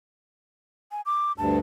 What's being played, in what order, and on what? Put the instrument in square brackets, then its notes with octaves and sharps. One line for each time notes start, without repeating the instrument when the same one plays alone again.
[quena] G#5
D6
[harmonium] D2 G2 [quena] A5